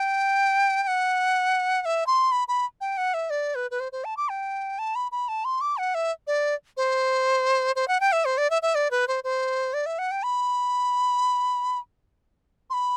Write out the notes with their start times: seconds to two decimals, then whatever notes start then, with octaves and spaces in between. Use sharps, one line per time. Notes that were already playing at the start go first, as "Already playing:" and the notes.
Already playing: G5
0.83 G5
0.88 F#5
1.82 F#5
1.85 E5
2.07 C6
2.32 B5
2.48 B5
2.81 G5
2.97 F#5
3.14 E5
3.30 D5
3.55 B4
3.71 B4
3.80 C5
3.92 C5
4.04 A5
4.17 D6
4.29 G5
4.79 A5
4.95 B5
5.12 B5
5.28 A5
5.45 C6
5.61 D6
5.77 F#5
5.95 E5
6.27 D5
6.77 C5
7.76 C5
7.88 F#5
8.00 G5
8.12 E5
8.25 C5
8.38 D5
8.50 E5
8.62 E5
8.75 D5
8.91 B4
9.08 C5
9.24 C5
9.74 D5
9.86 E5
9.99 F#5
10.11 G5
10.23 B5
12.70 C6
12.73 B5